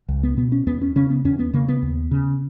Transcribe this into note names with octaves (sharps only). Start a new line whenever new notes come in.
C#2
B3
B2 B3
C#4
E2 B3
C#4
C#3 C#4
B3
E2 C#4
B3
C#3 A#3
B3
D#2
C#3